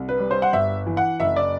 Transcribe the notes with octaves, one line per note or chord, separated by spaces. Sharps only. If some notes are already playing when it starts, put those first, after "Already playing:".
Already playing: C2
B4
G3
C5
F#5
G1 E5
E3
F#5
F#1 E5
D5